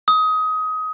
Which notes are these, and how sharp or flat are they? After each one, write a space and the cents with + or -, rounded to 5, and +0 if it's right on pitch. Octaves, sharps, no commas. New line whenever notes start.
D#6 +20